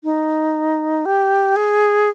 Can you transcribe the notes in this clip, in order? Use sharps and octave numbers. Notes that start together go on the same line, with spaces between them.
D#4
G4
G#4